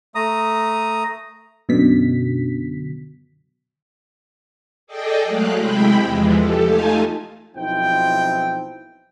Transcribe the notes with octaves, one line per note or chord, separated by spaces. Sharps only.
A3 A#5 D#6
F#2 B2 D3 B6
G#4 A4 D5 D#5 G5
F#3 G#3 A3 F5 F#6
C3 G#3 E4 G5 B5
E2 E3 F3 G#3
G4 A4
A3 D#4 F4 F5 G#5 A5
B1 F3 C4 D#4 E4 G5